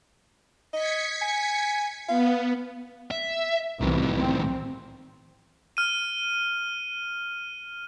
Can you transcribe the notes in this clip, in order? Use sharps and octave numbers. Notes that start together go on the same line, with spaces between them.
D#5 G#6 B6 C#7
G#5
B3 F5
E5
C2 A2 C3 D#3 E3
C4
F6 D#7